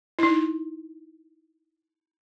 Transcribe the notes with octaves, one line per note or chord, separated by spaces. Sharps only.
D#4 E4